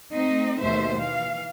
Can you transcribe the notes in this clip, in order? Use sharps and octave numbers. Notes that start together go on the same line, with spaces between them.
A3 C4 D#4 D#5
D#2 B2 A3 C5 E5
E3 F5